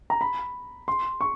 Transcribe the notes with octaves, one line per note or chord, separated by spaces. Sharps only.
A#5
B5
C6
C#6